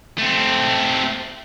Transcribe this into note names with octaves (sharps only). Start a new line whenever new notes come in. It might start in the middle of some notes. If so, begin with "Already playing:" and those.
A3 C4